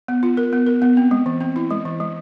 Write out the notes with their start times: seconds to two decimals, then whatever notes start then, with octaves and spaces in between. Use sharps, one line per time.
0.08 B3
0.23 F4
0.37 A#4
0.53 B3
0.67 A#4
0.82 B3
0.97 C4
1.11 G#3
1.26 E3
1.41 C4
1.56 E4
1.71 G#3
1.85 E3
2.00 G#3